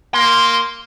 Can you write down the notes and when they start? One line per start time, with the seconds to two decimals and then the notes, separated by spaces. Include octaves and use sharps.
0.14 A#3 C6